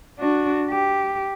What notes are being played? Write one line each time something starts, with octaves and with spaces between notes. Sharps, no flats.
D4 F#4
G4